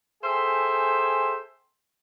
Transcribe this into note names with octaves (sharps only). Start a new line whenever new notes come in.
G#4 A4 C5 E5 G5 G#5